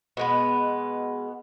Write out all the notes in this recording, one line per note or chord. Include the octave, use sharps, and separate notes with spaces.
B2 G#3 B3